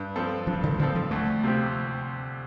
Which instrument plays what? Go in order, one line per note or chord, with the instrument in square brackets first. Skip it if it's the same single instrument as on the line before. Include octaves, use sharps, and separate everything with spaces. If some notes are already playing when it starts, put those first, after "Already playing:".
Already playing: [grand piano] G2
F3 C4 A4
[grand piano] G2 [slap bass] F3
[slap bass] D3
[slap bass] D3 [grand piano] F3 C4 A4
[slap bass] F3
[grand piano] D2 [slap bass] A3
[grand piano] C3 F3 C4 G4